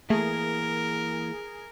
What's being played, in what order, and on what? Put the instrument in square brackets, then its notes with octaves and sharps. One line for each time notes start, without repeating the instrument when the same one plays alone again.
[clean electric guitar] E3 A#3 [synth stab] A3 [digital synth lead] G#4 [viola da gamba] A#4